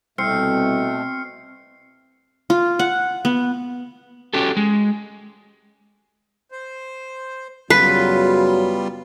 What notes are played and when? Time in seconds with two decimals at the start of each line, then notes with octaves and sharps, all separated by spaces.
0.18 C2 B2 A3 C4 F6 C7 C#7
2.50 F4
2.79 F#5
3.25 B3
4.34 C#4 F#4 G4 A4
4.57 G#3
6.52 C5
7.70 F#2 C#3 F#3 G3 B3 F4 B4